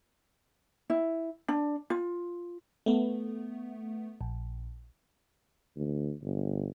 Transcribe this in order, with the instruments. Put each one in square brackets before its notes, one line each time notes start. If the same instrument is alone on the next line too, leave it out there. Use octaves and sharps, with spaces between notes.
[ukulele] E4
D4
F4
[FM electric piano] A3 B3
A#1
[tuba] D2
G1